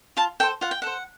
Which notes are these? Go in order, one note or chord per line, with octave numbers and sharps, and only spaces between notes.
F4 A5
A4 C5 G5
F4 F#5
G5
A4 C5 F#5